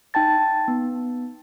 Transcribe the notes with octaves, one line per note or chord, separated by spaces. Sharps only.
D#4 G5 A5 A6
B3